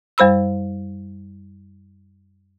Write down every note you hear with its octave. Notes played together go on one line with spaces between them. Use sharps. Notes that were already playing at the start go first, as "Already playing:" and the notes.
F#2 G3 C5 B5 E6